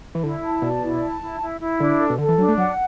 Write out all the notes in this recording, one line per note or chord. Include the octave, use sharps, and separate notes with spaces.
E3
D3 E4
A5
B2 D5
E4
A5
E4
E4
E4
D3 D4
A4
B2
D3 A4
E3
F#3 D4
A3
F#3 F#5